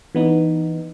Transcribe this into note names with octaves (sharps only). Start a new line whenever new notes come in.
E3 B3 D#4